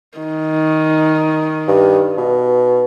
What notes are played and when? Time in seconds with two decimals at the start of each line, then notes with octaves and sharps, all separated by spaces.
0.19 D#3
1.68 G2
2.18 B2